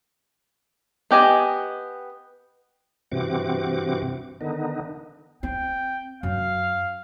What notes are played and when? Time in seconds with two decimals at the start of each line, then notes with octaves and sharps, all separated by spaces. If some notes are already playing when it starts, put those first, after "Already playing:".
1.11 B3 G4 D#5 G#5
3.12 G2 C3 E3 C4 F#4 D6
4.41 D3 D#3 B3 D#4
5.43 C4 G5
6.23 F#2 F5